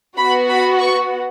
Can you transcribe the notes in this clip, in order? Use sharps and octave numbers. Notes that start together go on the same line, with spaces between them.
B3 F#4 B5
B5
C#6